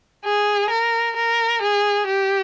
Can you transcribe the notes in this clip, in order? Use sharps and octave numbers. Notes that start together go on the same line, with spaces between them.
G#4
A#4
A#4
G#4
G4